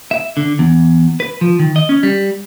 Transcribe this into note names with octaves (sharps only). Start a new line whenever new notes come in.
E5
D3
E2
B4
F3
D#3
D#5
C#4
G3